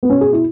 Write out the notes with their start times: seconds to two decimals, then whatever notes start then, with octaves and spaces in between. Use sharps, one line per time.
0.03 B3
0.10 B2 C#4
0.21 G#4
0.33 E4